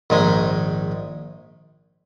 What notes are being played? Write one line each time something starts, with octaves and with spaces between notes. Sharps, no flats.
A#1 G#2 D#3 G#3